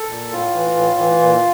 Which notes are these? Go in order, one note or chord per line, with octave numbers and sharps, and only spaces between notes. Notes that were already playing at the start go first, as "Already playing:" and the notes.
Already playing: A4
A#2
A2 F4
E3
A2
E3
A#2